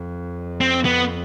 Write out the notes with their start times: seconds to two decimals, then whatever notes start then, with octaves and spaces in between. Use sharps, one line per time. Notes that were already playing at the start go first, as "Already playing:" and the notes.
Already playing: F2
0.61 C4
0.85 B3